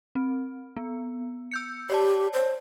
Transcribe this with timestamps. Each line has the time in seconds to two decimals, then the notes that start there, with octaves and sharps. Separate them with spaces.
0.15 C4
0.76 B3
1.51 E6 G6 C#7
1.90 G4 C#5 D5 A5
2.33 C5